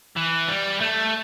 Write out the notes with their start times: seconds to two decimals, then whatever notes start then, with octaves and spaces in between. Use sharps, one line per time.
0.16 E3
0.48 G3
0.81 A3